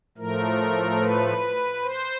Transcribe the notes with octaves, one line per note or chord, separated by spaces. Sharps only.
A2 F3 A3 A#4
B4
C5